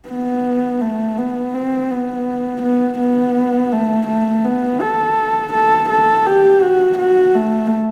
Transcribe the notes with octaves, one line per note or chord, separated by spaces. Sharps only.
B3
A3
B3
C4
B3
B3
B3
A3
A3
B3
A4
A4
A4
G4
F#4
F#4
A3